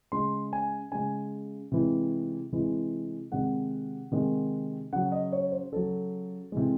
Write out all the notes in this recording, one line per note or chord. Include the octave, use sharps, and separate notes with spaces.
C#3 G#3 C6
G#5
C#3 G#3 G#5
C3 E3 G#3
C3 E3 G#3
C3 D#3 G#3 F#5
C3 D#3 G#3
C#3 F#3 F#5
D#5
C#5
C5
C#3 F#3 A4
C3 E3 G#3